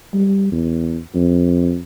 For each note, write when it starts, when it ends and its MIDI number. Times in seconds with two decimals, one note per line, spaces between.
0.14 0.50 55
0.52 0.99 40
1.15 1.79 41